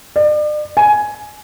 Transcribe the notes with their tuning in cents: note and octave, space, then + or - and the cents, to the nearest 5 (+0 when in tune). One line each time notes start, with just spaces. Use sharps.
D5 +40
G#5 +10